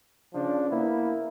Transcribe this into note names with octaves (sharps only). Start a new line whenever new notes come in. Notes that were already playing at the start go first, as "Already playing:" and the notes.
C#3 F3 D4
A#3 B3 E4